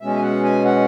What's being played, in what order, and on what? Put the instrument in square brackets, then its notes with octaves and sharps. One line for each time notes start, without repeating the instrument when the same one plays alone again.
[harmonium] B2 G#3 C#4 E5
G#5
F#5
G#5
F#5